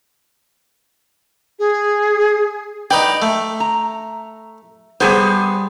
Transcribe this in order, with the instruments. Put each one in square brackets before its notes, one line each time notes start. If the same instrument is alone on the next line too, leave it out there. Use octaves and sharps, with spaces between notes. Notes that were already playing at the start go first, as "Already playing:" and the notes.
[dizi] G#4
[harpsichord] D#4 B4 D5 [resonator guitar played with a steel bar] G5
[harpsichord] A3
[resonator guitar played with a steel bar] A#5
[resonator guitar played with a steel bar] G3 G#4 C5 [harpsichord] B3